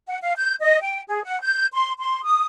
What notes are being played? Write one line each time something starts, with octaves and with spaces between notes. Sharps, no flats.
F#5
F5
G6
D#5
G5
G#4
F#5
G6
C6
C6
D#6